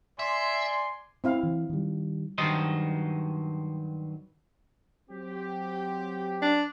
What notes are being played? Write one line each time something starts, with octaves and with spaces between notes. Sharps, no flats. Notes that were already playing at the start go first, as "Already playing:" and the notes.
D5 E5 G#5 C6
C4 E4 F5
E3
D#3 G3
G2 D#3 F#3 C5 D#5
F#3 C4 G4
D4